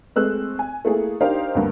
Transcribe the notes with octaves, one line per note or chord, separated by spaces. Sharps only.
G#3 A3 C4 E6 F#6
G#5
A3 A#3 E4 G#4
D4 D#4 G4 A#4 C5 F5
D2 G2 A#3